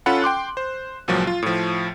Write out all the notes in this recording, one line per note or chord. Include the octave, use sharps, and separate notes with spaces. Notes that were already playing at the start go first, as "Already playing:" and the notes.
C#4 F4 A4 F#5 B5
G5 C6 D6 F#6
C5
C#2 A#2 F3 F#3
F4
A2 F3